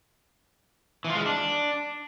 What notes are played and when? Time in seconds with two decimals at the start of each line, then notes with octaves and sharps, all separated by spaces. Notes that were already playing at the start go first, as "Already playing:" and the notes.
1.05 E3
1.10 F4
1.15 G#3
1.20 F4
1.26 D4